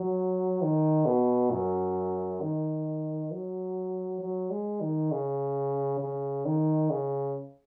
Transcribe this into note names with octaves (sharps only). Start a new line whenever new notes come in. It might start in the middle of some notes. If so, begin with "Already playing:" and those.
Already playing: F#3
D#3
B2
F#2
D#3
F#3
F#3
G#3
D#3
C#3
C#3
D#3
C#3